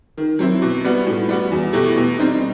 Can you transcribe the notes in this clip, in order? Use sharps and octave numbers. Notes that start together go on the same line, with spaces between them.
D#3
F#3 C4 E4
B2
G3 B3 F#4
A2
G3 B3 F#4
E2
B2 A3 E4 G4
B2
G3 C4 D#4